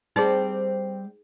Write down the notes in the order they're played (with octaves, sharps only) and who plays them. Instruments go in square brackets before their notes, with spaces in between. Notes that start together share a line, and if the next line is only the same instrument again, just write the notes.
[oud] G3 C4 D5 [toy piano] D#4 G#4